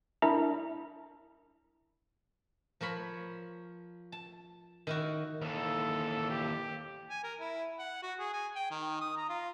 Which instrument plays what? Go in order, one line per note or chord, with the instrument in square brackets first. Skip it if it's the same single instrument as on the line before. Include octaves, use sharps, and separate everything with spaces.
[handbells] D4 E4 A#4 E5 A#5
[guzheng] F3 A#4 C#5 B5
A5
D#3 E4 F#4
[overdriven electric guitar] D#2 E3 [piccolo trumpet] A4
[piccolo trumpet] G4
[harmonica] G#5
A#4
E4
F#5
F#4
G#4
G#5
G5
D#3
D#6
A#5
F4